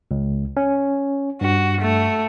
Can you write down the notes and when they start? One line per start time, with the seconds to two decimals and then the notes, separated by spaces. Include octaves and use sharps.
0.11 C#2
0.57 C#4
1.41 G2 F#4
1.81 A3